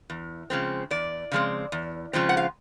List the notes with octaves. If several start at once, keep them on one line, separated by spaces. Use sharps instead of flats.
E2
C#3 F3 G#3 C4
E2 D5
C#3 F3 G#3 C4
E2
C#3 F3 G#3 C4
F#5
F5